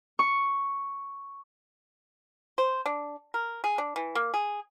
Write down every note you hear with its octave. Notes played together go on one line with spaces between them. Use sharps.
C#6
C5
D4
A#4
G#4
D4
E3
A#3
G#4